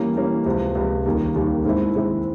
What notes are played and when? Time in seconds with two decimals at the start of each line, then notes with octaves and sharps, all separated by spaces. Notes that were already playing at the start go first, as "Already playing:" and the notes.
Already playing: E3 G3 A#3 C#4
0.16 E3 G3 A#3 C#4
0.46 C#2 C3 F3
0.75 C#2 C3 F3
1.06 D#2 D#3 G3 A#3
1.35 D#2 D#3 G3 A#3
1.65 G#2 D#3 G#3 C4 E4
1.95 G#2 D#3 G#3 C4 E4